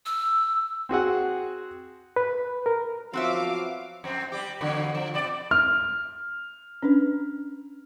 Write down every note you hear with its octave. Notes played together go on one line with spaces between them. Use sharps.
E6
C4 F#4 G#4 F#5
B4
A#4
F3 F#3 B3 C4 F#4 E5 F5 D6
F2 C4
G3 G4
E2 D3 F#3
F3
B2 D5
F6
C#4 D4 B4